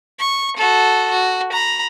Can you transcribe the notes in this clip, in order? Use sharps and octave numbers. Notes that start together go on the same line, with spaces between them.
C#6
F#4 A4
F#4
A#5 B5